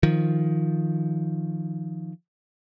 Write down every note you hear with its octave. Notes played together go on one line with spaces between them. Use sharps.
D#3 F3